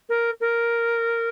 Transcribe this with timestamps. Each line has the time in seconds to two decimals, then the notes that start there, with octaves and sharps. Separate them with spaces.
0.09 A#4
0.40 A#4